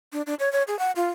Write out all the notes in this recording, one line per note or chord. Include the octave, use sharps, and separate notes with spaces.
D4
D4
C#5
C#5
G#4
F#5
F4